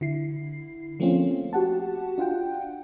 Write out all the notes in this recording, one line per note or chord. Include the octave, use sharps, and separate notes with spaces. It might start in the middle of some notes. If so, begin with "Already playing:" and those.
D3 E4 C7
F3 A3 A#3 C4 C#4 F4
F#4 G4 F#5 A5
D4 F4 F#5 G5